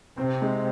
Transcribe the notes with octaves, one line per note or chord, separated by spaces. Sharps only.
C3 C4
G#3